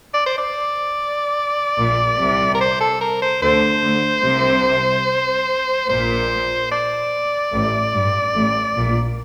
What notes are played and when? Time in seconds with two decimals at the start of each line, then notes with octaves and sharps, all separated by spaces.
0.14 D5
0.26 C5
0.38 D5
1.77 A#1 A#2
2.18 C2 C3
2.55 A#4
2.61 C5
2.80 A4
3.01 A#4
3.22 C5
3.42 D2 D3 C5
3.83 D2 D3
4.24 C2 C3
5.89 A#1 A#2 C5
6.72 D5
7.53 A1 A2
7.94 G2
8.35 A1 A2
8.77 A#1 A#2